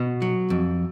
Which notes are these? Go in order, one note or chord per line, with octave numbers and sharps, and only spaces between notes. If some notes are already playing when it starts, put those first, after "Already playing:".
Already playing: B2 F#4
F#3
F2